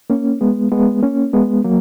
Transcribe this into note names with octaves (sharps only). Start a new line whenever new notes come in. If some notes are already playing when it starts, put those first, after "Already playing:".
A#3 C#4
G#3 B3
G#3 B3
A#3 C#4
G#3 B3
F#3 A#3